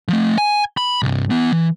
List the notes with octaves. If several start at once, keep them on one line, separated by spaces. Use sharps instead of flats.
F3 A3
G#5
B5
C2 G2
E3 B3
E3